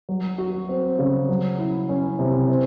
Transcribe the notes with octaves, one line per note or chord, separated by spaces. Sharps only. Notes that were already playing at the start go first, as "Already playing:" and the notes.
F#3
F#4
C4
C#3
F#3
E4
C#4
C3
C4